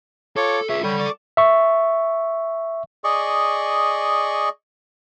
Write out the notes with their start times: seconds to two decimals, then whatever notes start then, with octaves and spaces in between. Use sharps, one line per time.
0.36 F4 A4 C#5 A5 D6
0.69 F4 G#4 C#5 E5
0.84 G3 A4 C#5 F#5 G5 B5
0.99 D5 C#6 D6
1.37 E5 C#6
3.04 G#4 D5 D#5 C#6